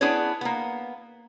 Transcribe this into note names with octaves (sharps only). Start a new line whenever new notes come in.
B3 D4 E4 G#4 B4 C#5
A#3 B3